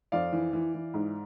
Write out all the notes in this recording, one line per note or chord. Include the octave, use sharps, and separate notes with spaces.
F2 D5 F5
E3
E3
E3
G#2